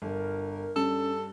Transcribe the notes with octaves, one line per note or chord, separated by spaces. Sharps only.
G1 A#4
G2 C#4 A4